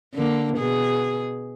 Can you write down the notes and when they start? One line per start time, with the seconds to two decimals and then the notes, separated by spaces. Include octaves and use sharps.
0.14 D3 A#3
0.57 B2 G#4